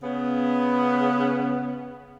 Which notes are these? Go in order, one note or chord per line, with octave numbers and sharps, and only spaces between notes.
C#3 B3